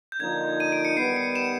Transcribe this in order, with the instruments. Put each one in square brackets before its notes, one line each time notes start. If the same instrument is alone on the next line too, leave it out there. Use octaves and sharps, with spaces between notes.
[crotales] G6
[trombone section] D3 F3 A#3 D#4 [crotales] G#6
[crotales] D#7
D7
C#7
[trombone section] D#3 G3 B3 [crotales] C7
[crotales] C#7
E7